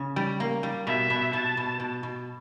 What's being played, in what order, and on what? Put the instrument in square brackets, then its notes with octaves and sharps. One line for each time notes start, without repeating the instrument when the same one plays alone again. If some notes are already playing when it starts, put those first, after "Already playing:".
Already playing: [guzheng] C#3
G3
A#3
G3
[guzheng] B2 [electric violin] E5
[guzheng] B2
[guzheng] B2 [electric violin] A5
[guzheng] B2
B2
B2